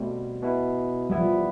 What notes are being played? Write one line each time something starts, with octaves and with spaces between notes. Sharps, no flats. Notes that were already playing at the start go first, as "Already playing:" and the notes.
Already playing: B2 G3 A3 C4
B2 B3 E4
E3 G3 B3 E4
F3
G3